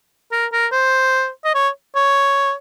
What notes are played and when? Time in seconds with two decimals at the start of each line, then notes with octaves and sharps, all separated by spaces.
0.32 A#4
0.53 A#4
0.72 C5
1.44 D#5
1.55 C#5
1.95 C#5